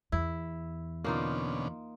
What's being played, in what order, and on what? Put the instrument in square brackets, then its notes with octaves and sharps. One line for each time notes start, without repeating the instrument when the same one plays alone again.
[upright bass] E2 [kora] E4
[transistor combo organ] B2 D3 C#4 [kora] A#3 D#4 F4